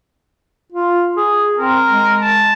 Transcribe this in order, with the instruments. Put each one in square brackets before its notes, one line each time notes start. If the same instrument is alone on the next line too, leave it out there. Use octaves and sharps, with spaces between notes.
[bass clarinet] F4
G#4
[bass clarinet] C4 [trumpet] A#4
[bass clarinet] G#3
[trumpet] A5